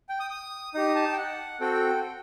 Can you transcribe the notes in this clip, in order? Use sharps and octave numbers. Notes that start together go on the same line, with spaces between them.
G5
D#6
D#6
D#4 G4 D#6
A5
G5
F#5
C4 F#4 A4 G5